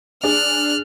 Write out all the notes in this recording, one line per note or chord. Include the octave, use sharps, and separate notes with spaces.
D4 G#4 F6 F#6